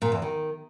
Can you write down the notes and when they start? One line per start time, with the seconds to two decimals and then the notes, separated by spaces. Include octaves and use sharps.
0.02 A#2
0.12 E2
0.22 D#3